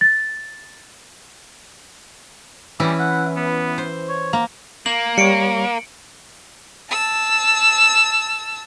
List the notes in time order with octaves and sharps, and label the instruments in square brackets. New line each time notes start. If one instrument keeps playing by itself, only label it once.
[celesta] A6
[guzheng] E3 C#4 E4 [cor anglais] G3
[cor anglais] F#5
B3
[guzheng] C5
[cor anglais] C#5
[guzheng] A#3
[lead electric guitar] A#3 [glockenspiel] F#7
[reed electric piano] G3 C#5 [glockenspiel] C#7 D7
[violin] A5 E6